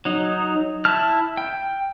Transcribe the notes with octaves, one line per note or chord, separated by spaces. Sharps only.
F#3 D#4
E4 A5 F6
G5